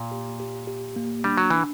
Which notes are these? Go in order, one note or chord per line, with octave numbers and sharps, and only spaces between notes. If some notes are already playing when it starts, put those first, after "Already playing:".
Already playing: A#2 A#3
G4
G4
G4
A#3
G3 D4
F#3
E3 D4